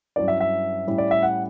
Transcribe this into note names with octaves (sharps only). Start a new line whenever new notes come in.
G2 F#3 C#4 E4 D5
E5
E5
A2 G3 C#4 E4
D5
E5
F#5